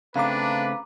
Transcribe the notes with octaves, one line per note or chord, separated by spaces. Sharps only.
C#3 A3 C4 D4 B4 F5 A#5 D6